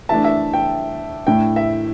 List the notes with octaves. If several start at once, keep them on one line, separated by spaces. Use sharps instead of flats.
E3 A3 D4 E5 A5
E5
G5
A2 A3 D4 G5
E5